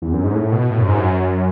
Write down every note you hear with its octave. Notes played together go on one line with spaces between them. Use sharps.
E2
F#2
G#2
A2
B2
A2
F#2
G#2
F#2